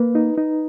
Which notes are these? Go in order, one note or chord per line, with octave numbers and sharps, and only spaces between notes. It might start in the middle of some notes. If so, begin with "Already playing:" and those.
Already playing: A#3 B4
D#4
D#4